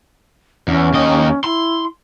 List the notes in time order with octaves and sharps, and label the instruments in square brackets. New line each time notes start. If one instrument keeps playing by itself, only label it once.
[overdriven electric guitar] E2 [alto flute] C#4
[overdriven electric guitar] D#2 D#5
[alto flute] E4 [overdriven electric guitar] C6